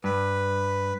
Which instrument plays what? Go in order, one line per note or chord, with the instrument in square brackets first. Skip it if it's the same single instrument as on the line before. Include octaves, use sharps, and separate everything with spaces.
[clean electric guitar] G2 [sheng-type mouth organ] B4